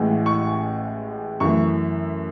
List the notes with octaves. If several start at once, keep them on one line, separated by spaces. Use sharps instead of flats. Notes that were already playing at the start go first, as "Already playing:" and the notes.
Already playing: A1 A2 E3 G#3
C#6
F#2 E3 A3 C#6